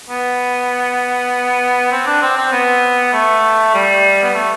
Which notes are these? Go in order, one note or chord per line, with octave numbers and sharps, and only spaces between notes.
B3
C4
D4
C4
C4
B3
A3
G3
B3
A3